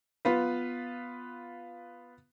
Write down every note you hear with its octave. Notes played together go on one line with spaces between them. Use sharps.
B3 F4 B4